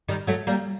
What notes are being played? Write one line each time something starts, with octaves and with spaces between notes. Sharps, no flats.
D#3 G3
F#3 A3
G3 A#3